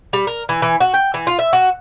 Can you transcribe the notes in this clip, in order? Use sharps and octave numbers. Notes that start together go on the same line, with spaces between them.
G3
A#4
E3
E3
F#4
G5
E3
F4
E5
F#4